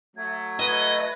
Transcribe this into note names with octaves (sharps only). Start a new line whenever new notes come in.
F#3 A3 G#6
B4 D#5